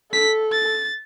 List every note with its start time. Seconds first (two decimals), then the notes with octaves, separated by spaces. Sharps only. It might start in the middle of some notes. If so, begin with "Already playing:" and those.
0.12 A4 B6
0.52 A6